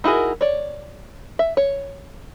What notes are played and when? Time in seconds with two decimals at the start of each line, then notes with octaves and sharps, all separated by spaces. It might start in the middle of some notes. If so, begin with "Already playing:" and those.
0.04 D#4 E4 F#4 G#4 A#4
0.41 C#5 D5
1.39 E5
1.57 C#5